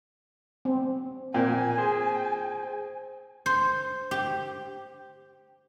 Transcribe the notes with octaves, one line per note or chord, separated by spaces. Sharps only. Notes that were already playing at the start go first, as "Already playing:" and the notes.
C4
A#2 C4 G5 G#5
G#4 C5
C5
G4